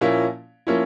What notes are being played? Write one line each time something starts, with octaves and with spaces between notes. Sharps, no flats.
A#2 F3 A#3 C#4 E4
F3 A#3 C#4 E4